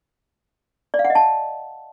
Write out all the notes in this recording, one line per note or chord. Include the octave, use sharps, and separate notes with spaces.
D5
F5
F#5
D#5
A5